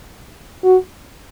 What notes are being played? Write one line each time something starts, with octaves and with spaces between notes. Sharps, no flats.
F#4